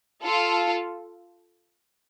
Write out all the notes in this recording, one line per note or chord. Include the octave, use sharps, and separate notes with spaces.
F4 A4